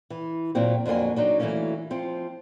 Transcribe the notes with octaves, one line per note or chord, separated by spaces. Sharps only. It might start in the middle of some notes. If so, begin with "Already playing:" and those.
E3
A#2 F#3 A#3 C4
F2 D3 F#3 A#3 G#5
F#3 D4 D#4
E3 F#3 A3 A#3 C#4
F3 C4